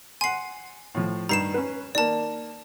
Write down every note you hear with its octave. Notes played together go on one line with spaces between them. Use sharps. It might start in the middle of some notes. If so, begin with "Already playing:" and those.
F#5 G#5 C6 C7
A2 F3
G2 D#3 A#5 C7 E7
C#4 B4
D#3 A#3 D5 A5